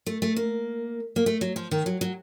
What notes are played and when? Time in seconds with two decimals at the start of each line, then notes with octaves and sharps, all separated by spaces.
0.06 A3
0.22 A3
0.36 A#3
1.16 A#3
1.26 A3
1.41 F#3
1.56 F3
1.71 D#3
1.86 F#3
2.01 F#3